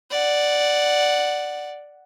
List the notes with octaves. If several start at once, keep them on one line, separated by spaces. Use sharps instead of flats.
D5 F#5